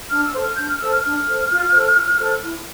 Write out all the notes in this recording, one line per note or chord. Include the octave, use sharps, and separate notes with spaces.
D4 F6
E6
A4 C5
F6
D4 G6
F6
A4 C5 E6
F6
D4 F6
A4 C5
F4
A4 C5
F4
A4 C5
E4